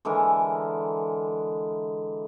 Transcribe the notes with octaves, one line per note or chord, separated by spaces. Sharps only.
D3 E3 G#3 A#4